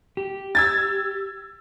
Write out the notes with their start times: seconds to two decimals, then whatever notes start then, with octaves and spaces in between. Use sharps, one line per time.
0.17 G4
0.55 E6 G#6 A6